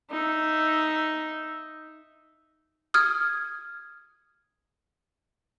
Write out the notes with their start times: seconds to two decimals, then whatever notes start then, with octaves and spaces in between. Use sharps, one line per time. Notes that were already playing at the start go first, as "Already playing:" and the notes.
0.10 D#4 E5
2.94 D#6 F6 G#6